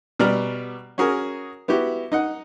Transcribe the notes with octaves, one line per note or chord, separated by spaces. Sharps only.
B2 G3 D5 A#5 F6
C#4 F#4 G#4 A#4
B3 E4 F#4 G4
D#4 D#5 F#5